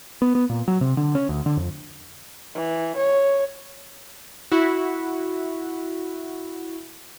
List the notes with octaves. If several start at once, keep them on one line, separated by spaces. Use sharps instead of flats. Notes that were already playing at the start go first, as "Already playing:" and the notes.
B3
B3
A#2
F#3
C3
D3
C#4
D2
D3
F2
E3
C#5
E4 F#4